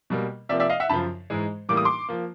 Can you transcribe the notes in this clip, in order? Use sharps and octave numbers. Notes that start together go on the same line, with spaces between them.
B2 G3 A#3
C3 F3 A#3 D5 E5
D5 E5
D#5 F5
E5 F#5
F#2 C#3 F3 A5 B5
G#2 E3 G#3
A2 E3 G3 A#3 D6
D#6
C6 D6
F3 A#3